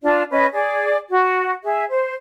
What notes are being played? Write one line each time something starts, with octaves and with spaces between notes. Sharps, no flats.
D4 F4 D5
C#4 B4 D#5
G#4 D5
F#4
G#4 E5
C5